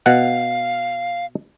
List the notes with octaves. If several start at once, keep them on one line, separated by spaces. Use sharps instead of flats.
B2 F5 F#5